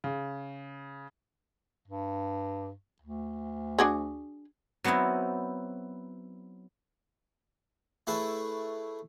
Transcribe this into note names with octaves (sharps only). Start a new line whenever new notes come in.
C#3
G2
D2
D4 F#4 G#4
F#3 B3 C4 D#4 E4
A3 E4 G#4 B4 C#5